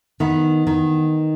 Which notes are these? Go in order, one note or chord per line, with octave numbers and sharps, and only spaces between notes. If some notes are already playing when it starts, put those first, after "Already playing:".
D#3 B3
D#3